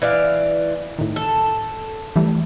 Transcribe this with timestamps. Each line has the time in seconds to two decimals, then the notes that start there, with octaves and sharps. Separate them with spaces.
0.02 E3 D5 F5
0.99 A2 D#3
1.16 A4
2.16 E3 G3 A3